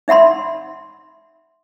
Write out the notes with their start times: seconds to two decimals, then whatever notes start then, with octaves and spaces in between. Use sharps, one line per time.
0.08 D#4 E5 F#5 B5 C6